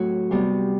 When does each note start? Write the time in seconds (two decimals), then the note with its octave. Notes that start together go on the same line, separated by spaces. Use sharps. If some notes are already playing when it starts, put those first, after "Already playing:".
Already playing: A2 F#3 A3 C4 F#4
0.31 C3 G3 B3